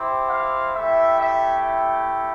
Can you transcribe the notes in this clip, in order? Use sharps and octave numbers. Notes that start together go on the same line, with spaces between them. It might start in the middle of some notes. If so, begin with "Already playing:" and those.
Already playing: C4 E4 G4
F5
A3 E4 G4 E5
E5